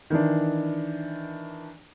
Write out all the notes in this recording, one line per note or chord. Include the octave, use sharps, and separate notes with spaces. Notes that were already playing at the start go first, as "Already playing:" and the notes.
D#3 E3 D4